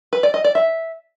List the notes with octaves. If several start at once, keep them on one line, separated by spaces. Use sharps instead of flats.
B4
D5
D#5
D5
E5